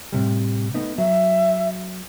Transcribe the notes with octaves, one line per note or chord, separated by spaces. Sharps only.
A2 C3 G3
A3 B3 D#4
F#3 E5